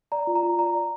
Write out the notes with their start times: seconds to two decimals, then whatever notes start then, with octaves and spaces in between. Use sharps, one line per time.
0.12 D5 A#5
0.27 F4
0.35 A#5
0.43 F4
0.59 D5 A#5
0.75 D5